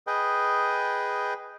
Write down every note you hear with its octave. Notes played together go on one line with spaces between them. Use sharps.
G#4 B4 D#5 G5